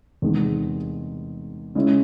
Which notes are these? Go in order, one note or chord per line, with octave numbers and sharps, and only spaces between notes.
E2 C3 D#3 G#3
C#3 G#3 C#4 E4